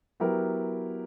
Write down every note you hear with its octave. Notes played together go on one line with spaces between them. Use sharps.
F#3 B3 E4 G4 A#4